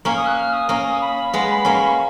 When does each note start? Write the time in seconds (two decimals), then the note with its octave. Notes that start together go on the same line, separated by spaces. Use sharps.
0.05 A#3 C#4 C#6
0.16 D#6
0.26 F#6
0.37 F6
0.53 D#6
0.69 A#3 C#4
1.01 B5
1.34 G#3 B3
1.65 A#3 C#4 C#6
1.75 B5
1.87 C#6